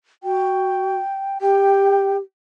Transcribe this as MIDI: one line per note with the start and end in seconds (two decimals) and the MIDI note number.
0.24 0.95 66
0.24 1.38 79
1.41 2.17 67
1.41 2.16 79